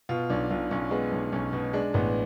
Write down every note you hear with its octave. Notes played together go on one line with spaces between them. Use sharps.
B2 F4
B1 D4
B1 F4
B1 C#4
G#3 B3
B1
B1 C#4
B2
G#3 D4
A1 B3